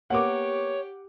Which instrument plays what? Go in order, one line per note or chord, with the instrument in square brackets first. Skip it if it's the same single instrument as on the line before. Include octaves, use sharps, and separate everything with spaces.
[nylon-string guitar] A#3 B3 A#4 [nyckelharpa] G4 [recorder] C#5 [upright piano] F#5 D6